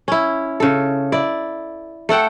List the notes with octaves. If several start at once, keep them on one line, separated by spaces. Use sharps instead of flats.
C#4 E4
C#3 A4
E4 D5
A3 A4 F#5 G5